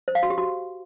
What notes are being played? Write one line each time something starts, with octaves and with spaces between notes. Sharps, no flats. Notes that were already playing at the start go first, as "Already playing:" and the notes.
C5
F5
F#4
G4
F#4